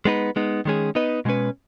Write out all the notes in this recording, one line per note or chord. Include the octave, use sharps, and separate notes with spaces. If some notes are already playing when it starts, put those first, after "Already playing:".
G#3 B3 D#4 B4
G#3 B3 D#4
D#3 G#3 C#4 G#4
B3 D#4 B4 D#5
B2 G#3 C#4 B4